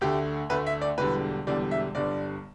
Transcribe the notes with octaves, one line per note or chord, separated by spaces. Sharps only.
D2 D3 A3 G4
D2 D3 A3 B4
E5
D5
E1 E2 D3 G3 B4
E1 E2 D3 G3 D5
E5
G1 G2 D3 G3 D5